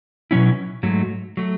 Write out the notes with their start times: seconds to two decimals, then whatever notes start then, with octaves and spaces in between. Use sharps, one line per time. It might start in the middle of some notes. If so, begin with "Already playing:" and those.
0.31 B2 F#3 C#4 E4
0.83 G#2 F#3 A3
1.37 F#3 A3